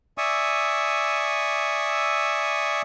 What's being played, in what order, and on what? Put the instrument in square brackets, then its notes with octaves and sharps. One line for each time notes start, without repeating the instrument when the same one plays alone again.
[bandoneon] D5 E5 G#5 C#6 D#6 E6